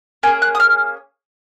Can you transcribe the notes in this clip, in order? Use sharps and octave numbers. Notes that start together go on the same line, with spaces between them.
A#3 C#4 G#4 G#5
F#6
D#6
F6